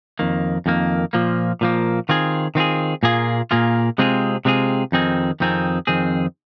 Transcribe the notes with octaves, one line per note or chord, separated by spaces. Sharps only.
F2 D#3 A#3
F2 D#3 A#3
A#2 F3 A#3
A#2 F3 A#3
D#3 C4 F4 G#4
D#3 C4 F4 G#4
A#2 A#3 F4 G#4
A#2 A#3 F4 G#4
C3 G#3 C4 F4 G#4
C3 G#3 C4 F4 G#4
F2 D#3 C4 D#4 G#4
F2 D#3 C4 D#4 G#4
F2 D#3 C4 G#4